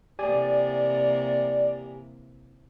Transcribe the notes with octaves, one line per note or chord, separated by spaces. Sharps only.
C3 E3 A#3 G4 D5 G#5